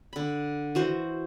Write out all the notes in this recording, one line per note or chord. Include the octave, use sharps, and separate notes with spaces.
D3 B5
E3 F#4 C5